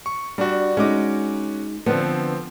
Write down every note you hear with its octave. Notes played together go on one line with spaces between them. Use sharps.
C#6
G3 D4 F#4
G#3 C#4 D#4 F#4 D6
D3 F3 B3 C4